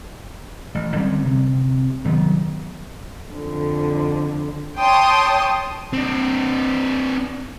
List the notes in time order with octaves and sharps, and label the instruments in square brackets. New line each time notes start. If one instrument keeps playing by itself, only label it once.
[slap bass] A1
D3 G3 C4 C#4
C3
F1 D#3 F#3 B3
[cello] F2 D3
[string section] C#5 G5 A5 C6 D#6
[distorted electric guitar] C4 D4